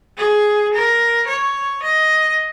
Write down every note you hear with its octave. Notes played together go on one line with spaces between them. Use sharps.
G#4
A#4
C#5
D#5